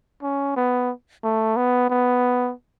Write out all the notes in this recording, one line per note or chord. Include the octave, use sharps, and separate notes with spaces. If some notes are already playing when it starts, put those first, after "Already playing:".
C#4
B3
A3
B3
B3